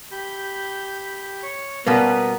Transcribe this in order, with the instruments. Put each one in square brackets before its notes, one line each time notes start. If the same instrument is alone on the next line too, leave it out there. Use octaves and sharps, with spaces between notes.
[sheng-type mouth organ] G4 B5 G6
C#5 C#6
[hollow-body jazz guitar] B2 G3 A#3 [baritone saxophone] B3 [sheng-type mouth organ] C#4